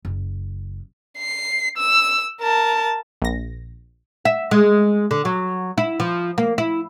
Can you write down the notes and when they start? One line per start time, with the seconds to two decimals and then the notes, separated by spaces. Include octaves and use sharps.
0.05 F#1
1.18 C7
1.78 E6
2.41 A#4 A5
3.22 A#1 A#6
4.25 E5
4.51 G#3
5.11 D3
5.25 F#3
5.78 E4
6.00 F3
6.38 A#3
6.58 E4